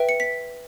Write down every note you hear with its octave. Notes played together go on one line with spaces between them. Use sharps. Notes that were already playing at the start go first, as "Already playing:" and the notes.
Already playing: B4 E5 G5
C#7
B6